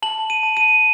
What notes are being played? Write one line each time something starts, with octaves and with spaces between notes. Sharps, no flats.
A5 F#7
D#7
A5
D#7